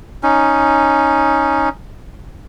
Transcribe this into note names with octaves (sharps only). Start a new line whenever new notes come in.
C#4 D#4